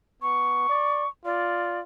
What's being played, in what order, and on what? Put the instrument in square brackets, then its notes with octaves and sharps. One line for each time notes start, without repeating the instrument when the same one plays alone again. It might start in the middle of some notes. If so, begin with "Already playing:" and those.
[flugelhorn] B3 [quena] C#6
[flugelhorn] D5
[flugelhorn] F4 [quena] D5